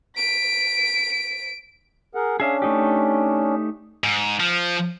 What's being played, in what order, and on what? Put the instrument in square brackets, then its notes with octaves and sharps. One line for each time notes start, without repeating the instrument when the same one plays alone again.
[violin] B6 D7
[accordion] G#4 A#4 F#5
[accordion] C#4 D4 [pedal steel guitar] G#4 E5 F5
[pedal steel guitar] A3 D#4 G4
[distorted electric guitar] G#2
F3